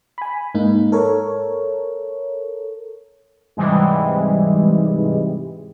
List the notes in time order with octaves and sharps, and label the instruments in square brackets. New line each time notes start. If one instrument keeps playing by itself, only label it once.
[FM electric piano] G#5 B5
G#2 A#3 D#4
A4 A#4 C#5
[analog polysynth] G#2 C3 E3 G3 G#3